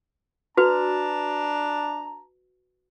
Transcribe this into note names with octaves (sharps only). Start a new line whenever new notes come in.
D4 F#4 B4 A5 A#5